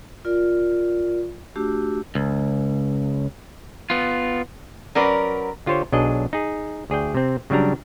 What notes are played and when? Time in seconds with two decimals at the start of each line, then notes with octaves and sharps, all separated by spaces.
0.25 F4 A#4 D5
1.56 A3 D4 F#4 G4 E6
2.15 C#2
3.90 B3 F4
4.95 F#3 C#4 A#4 B4 D5
5.66 D3 F4 G4 C5 C#5
5.92 B1 F#3 D4 G#4 D#5
6.33 D#4 G#4
6.90 D2 G#4 D5 G5
7.15 C3 C4
7.50 C#3 F#3 G3 D4 A#5